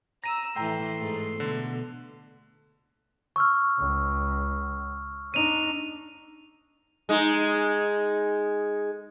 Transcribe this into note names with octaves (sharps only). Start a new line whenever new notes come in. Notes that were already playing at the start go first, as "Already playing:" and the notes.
A#5 E6 A#6 D#7
A2 E3 G5 A#5 C6
G#2 A3
B2 D3
C#6 E6 F6
C#2
D4 D#4 D#7 F7
G#3 D#4